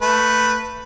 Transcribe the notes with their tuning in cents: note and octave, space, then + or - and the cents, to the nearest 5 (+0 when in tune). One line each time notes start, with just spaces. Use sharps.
A3 +15 B4 +0